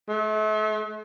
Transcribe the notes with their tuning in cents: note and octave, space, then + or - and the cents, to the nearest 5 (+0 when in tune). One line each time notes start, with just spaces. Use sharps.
A3 -40